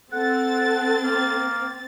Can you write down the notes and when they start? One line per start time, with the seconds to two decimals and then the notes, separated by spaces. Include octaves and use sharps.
0.13 C4 A4 F#5 A6
1.04 A#3